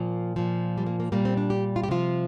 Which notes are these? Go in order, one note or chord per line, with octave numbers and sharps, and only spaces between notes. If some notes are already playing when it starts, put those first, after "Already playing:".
Already playing: A#2 F3 A#3
A#2 F3
G3
A#3
A#3
A#2 G3 A#3
C4
D4
G4
F4
G4
C3 F3 F4